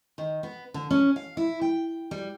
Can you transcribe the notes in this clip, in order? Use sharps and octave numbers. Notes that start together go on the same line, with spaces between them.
D#3
B3
D3
C#4
F5
E4
G5
G3